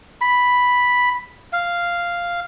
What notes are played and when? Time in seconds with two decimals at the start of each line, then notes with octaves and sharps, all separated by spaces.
0.21 B5
1.53 F5